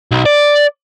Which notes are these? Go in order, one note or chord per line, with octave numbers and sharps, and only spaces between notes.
B1
D5